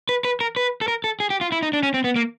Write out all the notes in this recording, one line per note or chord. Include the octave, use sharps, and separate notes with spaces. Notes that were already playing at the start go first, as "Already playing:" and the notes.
B4
B4
A#4
B4
A4
A#4
A4
G#4
G4
F4
E4
D#4
D4
C#4
C4
B3
A#3